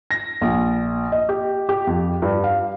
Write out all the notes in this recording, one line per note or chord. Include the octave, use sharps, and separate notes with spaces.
A#6
A#1
D#5
G4
G4
F2
G2
F5